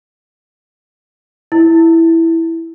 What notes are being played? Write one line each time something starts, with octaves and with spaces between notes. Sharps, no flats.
E4